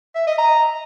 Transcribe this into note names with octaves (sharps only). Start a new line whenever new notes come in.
E5
D#5
A#5